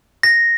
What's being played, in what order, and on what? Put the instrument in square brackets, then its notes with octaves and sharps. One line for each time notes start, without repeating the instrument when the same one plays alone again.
[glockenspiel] A#6